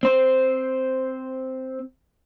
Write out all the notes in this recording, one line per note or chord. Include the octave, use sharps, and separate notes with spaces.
C4 C5